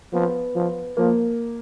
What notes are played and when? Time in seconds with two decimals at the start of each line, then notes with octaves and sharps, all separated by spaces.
0.13 F3 B3
0.55 F3
0.97 F3 A#3